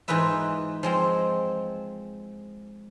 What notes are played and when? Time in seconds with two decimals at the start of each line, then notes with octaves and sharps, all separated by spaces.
0.08 G#2 E3 D#4 F4 B4 E5
0.83 F3 G#3 C4